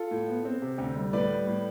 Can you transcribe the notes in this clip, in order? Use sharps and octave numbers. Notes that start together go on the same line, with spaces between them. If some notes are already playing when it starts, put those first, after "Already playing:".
Already playing: F4 A4
A2
B3
C4
C3
D2
G3
A2 B4 D5
G3
A2